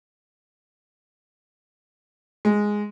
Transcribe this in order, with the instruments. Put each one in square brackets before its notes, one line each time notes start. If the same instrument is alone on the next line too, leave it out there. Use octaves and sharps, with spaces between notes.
[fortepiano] G#3